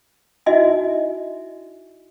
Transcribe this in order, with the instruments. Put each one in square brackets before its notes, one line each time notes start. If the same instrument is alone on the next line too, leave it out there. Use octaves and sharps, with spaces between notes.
[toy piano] D#4 E4 F#4 D#5 E5 G#5